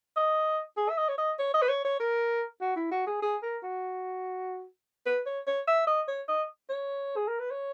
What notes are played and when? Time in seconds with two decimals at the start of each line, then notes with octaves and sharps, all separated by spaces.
0.17 D#5
0.77 G#4
0.90 E5
0.98 D#5
1.09 C#5
1.18 D#5
1.39 C#5
1.54 D#5
1.62 B4
1.69 C#5
1.85 C#5
2.00 A#4
2.61 F#4
2.76 E4
2.91 F#4
3.07 G#4
3.22 G#4
3.43 A#4
3.63 F#4
5.06 B4
5.26 C#5
5.47 C#5
5.68 E5
5.87 D#5
6.08 C#5
6.29 D#5
6.69 C#5
7.17 G#4
7.28 A#4
7.40 B4
7.51 C#5